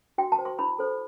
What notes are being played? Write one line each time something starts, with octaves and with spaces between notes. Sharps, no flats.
F#4 G5
A5
C5
C6
E4 B5
A4 C5